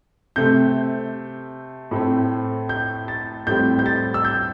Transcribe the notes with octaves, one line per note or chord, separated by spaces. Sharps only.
C3 A3 C4 G6
A2 A3 C4
G6
A6
A2 G3 C4 G6
G6
A6
E6
G6